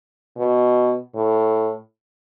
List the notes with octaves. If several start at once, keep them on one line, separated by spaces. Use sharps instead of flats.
B2
A2